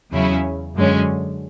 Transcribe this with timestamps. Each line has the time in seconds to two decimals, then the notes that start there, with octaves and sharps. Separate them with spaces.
0.12 E2 C#3 F#3 C#4 E4
0.75 F#2 D3 G#3 C#4